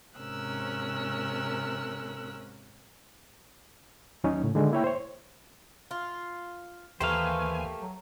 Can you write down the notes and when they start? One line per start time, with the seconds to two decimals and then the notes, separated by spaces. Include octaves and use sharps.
0.19 G#2 C3 C#4 A#4 E6 F#6
4.24 D#2 F#3 C#4 D#4
4.43 A2 C#3
4.55 D3 D#3 G#3
4.71 A#3 E4 C#5 G5
4.84 C5 C#5
5.91 F4
7.00 D#2 E3 A3 A#3 G4 C5 F5 G#5
7.81 F#3